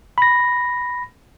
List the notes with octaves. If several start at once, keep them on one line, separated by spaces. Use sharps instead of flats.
B5 A#6